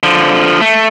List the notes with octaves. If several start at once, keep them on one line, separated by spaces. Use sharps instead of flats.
D3 F3
A3